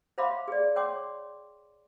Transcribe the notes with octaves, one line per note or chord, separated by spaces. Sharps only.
C5 E5 F5 B5 C6 D6
G#4 D5
C#5 G5 C6 D6